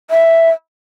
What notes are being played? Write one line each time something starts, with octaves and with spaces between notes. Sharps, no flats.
E5